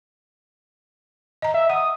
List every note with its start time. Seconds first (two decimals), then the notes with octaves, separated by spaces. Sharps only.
1.42 D#5 A#5
1.54 E5
1.70 F#5 D#6